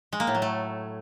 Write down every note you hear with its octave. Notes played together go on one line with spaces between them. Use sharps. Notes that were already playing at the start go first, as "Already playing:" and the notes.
G#3
A#3
A2
F#3
A3